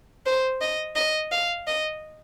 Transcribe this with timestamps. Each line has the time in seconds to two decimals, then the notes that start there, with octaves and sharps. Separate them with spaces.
0.26 C5
0.61 D#5
0.96 D#5
1.31 F5
1.67 D#5